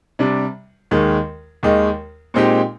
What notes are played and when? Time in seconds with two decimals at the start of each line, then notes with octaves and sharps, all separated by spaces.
0.19 C3 G3 D4
0.91 D#2 D#3 G#3
1.63 D#2 D#3 G#3
2.34 A#2 G#3 C4 D#4 G4